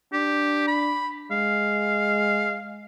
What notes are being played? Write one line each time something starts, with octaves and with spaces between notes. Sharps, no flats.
D4 G4
B5
G#3 F5